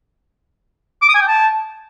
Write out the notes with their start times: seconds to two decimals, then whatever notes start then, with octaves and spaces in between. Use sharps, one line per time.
1.02 D6
1.08 D#6
1.15 G#5
1.21 G5
1.27 A5